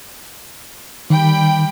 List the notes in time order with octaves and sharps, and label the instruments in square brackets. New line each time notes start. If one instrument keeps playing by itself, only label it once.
[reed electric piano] D#3 [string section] G3 G5 B5